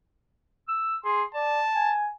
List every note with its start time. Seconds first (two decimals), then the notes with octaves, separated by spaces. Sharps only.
0.68 E6
1.05 G#4 C6
1.34 D5 A5
1.75 G#5